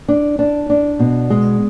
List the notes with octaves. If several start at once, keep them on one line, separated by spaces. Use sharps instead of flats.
D4
D4
D4
B2
G#3